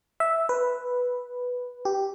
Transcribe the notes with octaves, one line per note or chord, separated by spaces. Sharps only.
E5
B4
G4